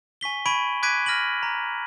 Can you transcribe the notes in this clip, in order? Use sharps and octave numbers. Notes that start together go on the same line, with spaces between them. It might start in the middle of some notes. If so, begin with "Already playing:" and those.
G#5 C#6 B6 G7
B5 C#6 G#6 D7 D#7 F#7
D6 F#6 G#6 B6 D7 D#7
F6 A#6 D#7 F#7
A#5